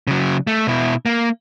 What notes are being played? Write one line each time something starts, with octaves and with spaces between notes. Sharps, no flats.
C#3 F#3
A3
B2 E4
A#3